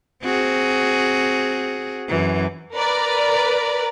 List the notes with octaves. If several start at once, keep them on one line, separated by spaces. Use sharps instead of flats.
C4 F#4 G#4
F#2 E3
A#4 B4 D5 A#5